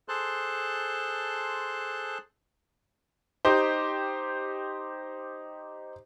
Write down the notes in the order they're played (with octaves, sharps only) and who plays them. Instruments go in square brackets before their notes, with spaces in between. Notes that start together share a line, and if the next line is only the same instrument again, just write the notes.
[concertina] G#4 A4 C5 A5 C6 F#6
[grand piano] D#4 G4 C5